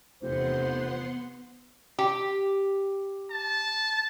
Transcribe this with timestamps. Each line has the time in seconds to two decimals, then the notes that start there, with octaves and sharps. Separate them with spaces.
0.22 F1 E2 C3 B3 C5 F#5 C6
1.99 G4
3.30 A5